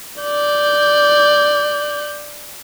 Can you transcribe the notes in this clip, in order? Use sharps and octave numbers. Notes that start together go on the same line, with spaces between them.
D5 G6